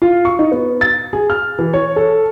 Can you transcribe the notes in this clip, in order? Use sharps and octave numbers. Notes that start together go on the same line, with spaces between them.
F4
C#6
D#4
B3
A6
G#4
F6
E3
C#5
A4